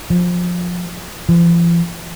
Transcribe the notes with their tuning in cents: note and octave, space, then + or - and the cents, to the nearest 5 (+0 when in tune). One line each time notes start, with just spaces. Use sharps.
F3 +20
F3 -45